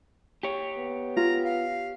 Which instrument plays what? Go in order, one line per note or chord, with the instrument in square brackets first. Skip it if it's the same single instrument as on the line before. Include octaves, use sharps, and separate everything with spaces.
[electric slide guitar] G4 C#5
[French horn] B3
[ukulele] F4 [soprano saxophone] A#5
[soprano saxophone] F5